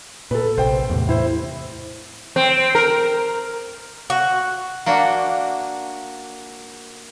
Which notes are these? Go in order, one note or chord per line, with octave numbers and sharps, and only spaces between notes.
A#2 A4 B4
A#1 C3 C5 G5
E2 A2 C3
E4 C5
C4
A#4
F#4
A#3 D4 F#4